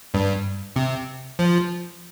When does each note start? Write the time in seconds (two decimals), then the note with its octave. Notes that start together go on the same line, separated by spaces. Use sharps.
0.14 G2
0.76 C3
1.39 F3